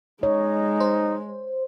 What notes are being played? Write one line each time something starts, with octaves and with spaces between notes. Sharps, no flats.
G#3 D#4 C#5
C5